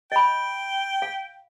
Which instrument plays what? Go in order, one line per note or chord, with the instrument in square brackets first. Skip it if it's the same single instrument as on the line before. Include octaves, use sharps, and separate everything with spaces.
[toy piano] D#5 B5 [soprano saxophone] G5
[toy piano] F5